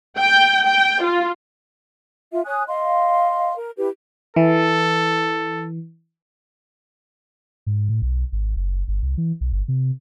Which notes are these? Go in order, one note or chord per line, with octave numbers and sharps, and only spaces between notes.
G5
G5
F4
F4 E5
C#5 G#5 D#6 F#6
D#5 F5 C6
A#4
E4 G4 B4
E3 A4
G#2
A2
B1
G#1
F#1
G1
C2
E3
B1
G1
C3